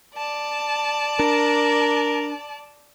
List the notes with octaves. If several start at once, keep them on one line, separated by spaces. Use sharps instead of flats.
D5 A5
D4 A#4